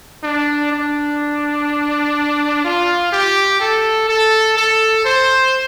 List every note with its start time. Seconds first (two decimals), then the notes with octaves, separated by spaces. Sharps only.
0.23 D4
0.72 D4
2.64 F4
3.12 G4
3.61 A4
4.09 A4
4.57 A4
5.05 C5